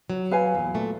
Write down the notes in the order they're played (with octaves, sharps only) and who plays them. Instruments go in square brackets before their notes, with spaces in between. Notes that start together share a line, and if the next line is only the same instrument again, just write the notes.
[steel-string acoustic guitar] F#3
[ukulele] B4 F5 G#5
[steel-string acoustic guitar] E2 A#2
A#2 A3